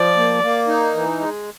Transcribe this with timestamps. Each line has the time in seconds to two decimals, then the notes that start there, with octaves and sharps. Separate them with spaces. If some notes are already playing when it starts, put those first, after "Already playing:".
Already playing: F3 D5
0.17 A#3
0.43 A#3
0.68 D#4
0.94 E3
1.20 G#3